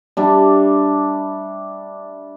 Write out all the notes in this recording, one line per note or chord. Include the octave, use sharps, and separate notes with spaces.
G3 D4 E5